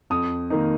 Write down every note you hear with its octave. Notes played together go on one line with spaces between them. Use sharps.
F2 D#6
D#3 A#3 D#4